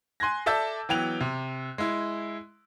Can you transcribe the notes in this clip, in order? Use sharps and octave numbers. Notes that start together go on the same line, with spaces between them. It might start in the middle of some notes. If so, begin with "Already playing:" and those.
G#5 C6 F#6 G#6 A#6
A4 D5 E5 A5 E6 G6
E3 F#3 B3 G5 F#6 F7
C3
G#3 E4